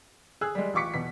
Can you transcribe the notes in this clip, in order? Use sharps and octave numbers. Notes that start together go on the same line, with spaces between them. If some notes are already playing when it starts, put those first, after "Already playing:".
G#4 E6 F#6
G3 G#3
A1 F4 C#6 D6 B6 C#7
E2 B2 B6